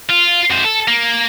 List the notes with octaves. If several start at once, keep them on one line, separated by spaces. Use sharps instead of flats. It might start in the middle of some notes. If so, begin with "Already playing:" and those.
F4
F#2 C5
A4
A#3